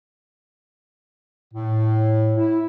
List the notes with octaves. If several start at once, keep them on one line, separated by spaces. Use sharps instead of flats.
A2
E4